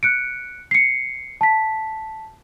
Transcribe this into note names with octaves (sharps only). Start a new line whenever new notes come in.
F#6 C#7 D7
C7 C#7
A5 B6